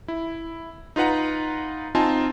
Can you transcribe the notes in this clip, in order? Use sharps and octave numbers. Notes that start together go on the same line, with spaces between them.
E4
D#4 F4 B4 F#5 A#5
C4 D#4 F4 G#5 A5